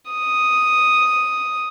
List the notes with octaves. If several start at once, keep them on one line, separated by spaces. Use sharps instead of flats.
D#6